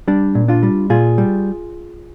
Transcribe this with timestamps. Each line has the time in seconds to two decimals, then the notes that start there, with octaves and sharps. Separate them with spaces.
0.08 G3 D4
0.35 A#2
0.48 D4 F4
0.63 G3
0.90 A#2 F4 G#4
1.18 G3